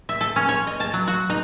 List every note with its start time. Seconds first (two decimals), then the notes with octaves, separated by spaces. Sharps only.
0.09 E5
0.21 A4
0.36 C#4
0.49 C#5
0.67 D#5
0.80 A5
0.94 F#3
1.07 F#4
1.30 D#4